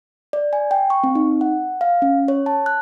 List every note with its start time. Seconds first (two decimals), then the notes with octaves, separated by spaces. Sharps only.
0.33 D5
0.53 G#5
0.71 G5
0.90 C#6
1.04 C4
1.15 D#4
1.41 F#5
1.81 F5
2.02 C#4
2.28 C#5
2.46 A5
2.66 F#6